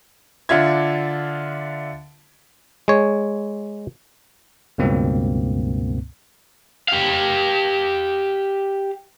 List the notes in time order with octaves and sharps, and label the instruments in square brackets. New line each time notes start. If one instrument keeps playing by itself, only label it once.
[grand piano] D3 D4 F4 E5 G#6
[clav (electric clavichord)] G#3 C#5
[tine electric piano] C#2 G2 B2 A#3 C4
[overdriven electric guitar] G4 F5